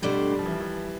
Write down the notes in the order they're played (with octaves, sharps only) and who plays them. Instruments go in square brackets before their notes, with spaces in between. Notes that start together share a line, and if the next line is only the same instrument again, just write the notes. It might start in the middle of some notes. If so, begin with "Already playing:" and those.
[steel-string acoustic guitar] B2 A3 D4 G4 C5 [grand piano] G3
[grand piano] G3
F3
E3
F3
E3